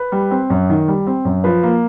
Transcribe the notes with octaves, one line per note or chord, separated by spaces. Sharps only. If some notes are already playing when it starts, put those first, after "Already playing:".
Already playing: B4
G3
C4
F#2
D#3
G3
C4
F#2
F3 B4
A#3